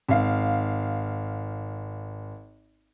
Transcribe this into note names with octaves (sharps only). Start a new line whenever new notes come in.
G#1 F5